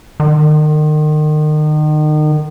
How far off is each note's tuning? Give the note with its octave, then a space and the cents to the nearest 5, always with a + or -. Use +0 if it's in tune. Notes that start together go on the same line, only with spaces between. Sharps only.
D#3 -35